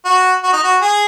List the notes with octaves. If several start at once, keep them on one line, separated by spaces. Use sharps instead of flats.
F#4
F#4
D#4
F#4
G#4